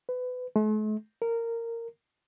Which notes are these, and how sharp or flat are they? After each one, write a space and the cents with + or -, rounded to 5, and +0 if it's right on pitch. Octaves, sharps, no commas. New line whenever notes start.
B4 +25
A3 -45
A#4 -15